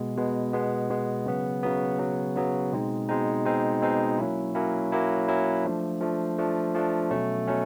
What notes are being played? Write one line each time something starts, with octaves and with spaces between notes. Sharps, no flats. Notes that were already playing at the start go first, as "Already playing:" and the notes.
Already playing: B2 G#3 B3
B2 G#3 B3
B2 G#3 B3
B2 G#3 B3
C#3 F#3 B3
C#3 F#3 B3
C#3 F#3 B3
C#3 F#3 B3
B2 G#3 C4 D#4
B2 G#3 C4 D#4
B2 G#3 C4 D#4
B2 G#3 C4 D#4
F#3 A#3 C#4 E4
F#3 A#3 C#4 E4
F#3 A#3 C#4 E4
F#3 A#3 C#4 E4
F3 A3 D4
F3 A3 D4
F3 A3 D4
F3 A3 D4
B2 F#3 A3 C#4
B2 F#3 A3 C#4